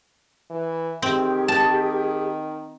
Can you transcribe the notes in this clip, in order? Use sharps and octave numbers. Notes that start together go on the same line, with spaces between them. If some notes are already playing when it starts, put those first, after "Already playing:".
E3
D#3 C4 G4 G#4
A5